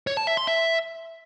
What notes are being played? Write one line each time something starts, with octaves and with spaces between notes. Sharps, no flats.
C#5
A5
E5
C6
E5